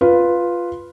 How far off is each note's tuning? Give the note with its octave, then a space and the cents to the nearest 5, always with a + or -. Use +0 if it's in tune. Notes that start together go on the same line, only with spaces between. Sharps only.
F4 +0 B4 +0